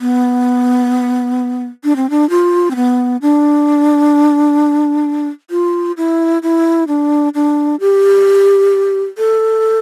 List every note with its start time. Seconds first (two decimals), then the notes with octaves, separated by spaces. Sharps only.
0.01 B3
1.84 D4
1.96 C4
2.10 D4
2.30 F4
2.71 C4
2.76 B3
3.22 D4
5.51 F4
5.97 E4
6.43 E4
6.88 D4
7.35 D4
7.80 G4
9.18 A4